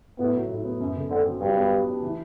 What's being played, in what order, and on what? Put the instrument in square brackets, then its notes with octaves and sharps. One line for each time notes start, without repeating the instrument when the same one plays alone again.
[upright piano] A2 [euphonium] B3
[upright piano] F#3
A2
B3
F#2
D3
[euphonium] D3 [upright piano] C4
[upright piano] F#3
[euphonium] G2 [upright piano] F#3
[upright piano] B3
G4
D4
E3